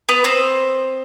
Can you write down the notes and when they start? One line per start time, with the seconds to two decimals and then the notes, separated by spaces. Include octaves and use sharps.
0.09 B3 B4
0.24 C4 C5